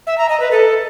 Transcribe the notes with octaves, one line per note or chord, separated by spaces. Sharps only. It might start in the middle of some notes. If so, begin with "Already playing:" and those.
E5
A#5
D#5
B4
A4